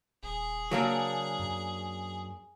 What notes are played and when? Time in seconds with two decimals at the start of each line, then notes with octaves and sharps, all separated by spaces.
0.23 D#1 G#4
0.71 C#3 F#3 A#3 D4
1.39 F#2